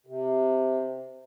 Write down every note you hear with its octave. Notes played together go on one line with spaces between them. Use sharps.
C3